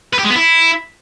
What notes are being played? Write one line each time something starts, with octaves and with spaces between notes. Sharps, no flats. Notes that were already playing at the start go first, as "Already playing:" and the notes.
B4
G4
G#3
B3
E4